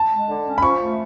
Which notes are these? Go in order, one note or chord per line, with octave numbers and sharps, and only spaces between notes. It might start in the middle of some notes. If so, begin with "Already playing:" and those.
Already playing: A5
G#3
D3
C#4
B5
F3 C#6
A3